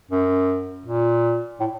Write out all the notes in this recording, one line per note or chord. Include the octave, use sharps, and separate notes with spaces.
F#2
A#2
A2